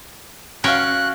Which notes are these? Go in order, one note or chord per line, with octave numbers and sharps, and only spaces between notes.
C#4 F#4 C#5 F5 G5 F#6